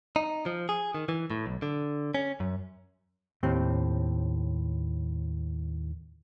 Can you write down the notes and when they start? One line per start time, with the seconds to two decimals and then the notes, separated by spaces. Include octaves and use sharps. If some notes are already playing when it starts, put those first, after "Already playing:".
0.16 D#4
0.46 F3
0.69 G#4
0.95 D#3
1.09 E3
1.30 A2
1.46 B1
1.62 D3
2.14 C#4
2.40 F#2
3.43 D#2 A2 C4 G4